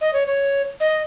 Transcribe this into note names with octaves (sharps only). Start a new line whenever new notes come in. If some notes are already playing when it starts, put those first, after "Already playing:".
D#5
C#5
C#5
D#5